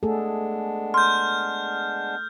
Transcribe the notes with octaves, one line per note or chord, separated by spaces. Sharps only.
G#3 A3 B3 D4 G#4 A4
C6 F6 G6